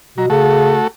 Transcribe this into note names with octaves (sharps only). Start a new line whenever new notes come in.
B2 F#3 A#5
C#3 A3 F#4 A4